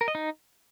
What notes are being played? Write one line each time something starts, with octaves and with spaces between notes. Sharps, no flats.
A#4
D#5
D#4